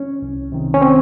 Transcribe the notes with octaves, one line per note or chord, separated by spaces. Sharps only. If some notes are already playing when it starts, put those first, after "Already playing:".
Already playing: C#4
C2
C3 D#3
C#4
C4